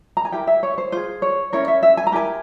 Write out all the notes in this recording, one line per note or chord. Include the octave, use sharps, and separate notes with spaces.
A#5
G#5
E4 G4 A#4 G5
E5
C#5
C5
F4 G#4 C5
C#5
C#4 E4 A#4 C#5
E5
E5
G#5
A#5
E4 G4 A#4 G#5